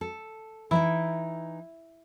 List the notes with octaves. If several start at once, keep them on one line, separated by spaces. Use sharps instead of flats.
A4
E3 D#4 E4 E5